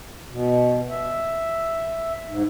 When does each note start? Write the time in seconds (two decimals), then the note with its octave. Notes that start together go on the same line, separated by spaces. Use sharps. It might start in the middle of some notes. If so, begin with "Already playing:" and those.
0.31 B2
0.89 E5
2.28 G#2